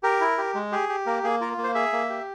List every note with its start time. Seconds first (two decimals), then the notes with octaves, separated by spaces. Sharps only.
0.03 G4 A#4
0.20 E4
0.38 G4
0.55 G#3
0.72 G4 G#4
0.89 G4
1.06 A#3 A#4
1.24 A#3 G#4
1.41 F4 A#4
1.58 A#3
1.64 C5
1.75 G#4 E5
1.93 A#3
2.09 G4